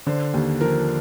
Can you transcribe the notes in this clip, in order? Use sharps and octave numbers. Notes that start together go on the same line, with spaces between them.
D3 C5
D#2
F3 A#4